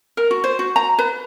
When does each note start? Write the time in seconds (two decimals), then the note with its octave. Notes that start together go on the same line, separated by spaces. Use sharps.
0.17 A#4
0.31 F#4
0.44 C5
0.59 F#4
0.76 A#5
0.99 B4